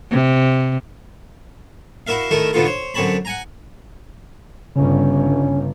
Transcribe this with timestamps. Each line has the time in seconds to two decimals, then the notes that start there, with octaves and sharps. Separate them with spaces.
0.11 C3
2.07 E4 F#4 A#4 E5 F5
2.31 D#3 A3 D#4 E4 A4 A#4
2.53 B2 D3 B3 D#4 F4 A4
2.65 C5 C#5
2.94 F#2 D3 C4 C#5 A5 B5
3.25 F#5 G#5 A#5
4.76 G1 G2 C#3 C#4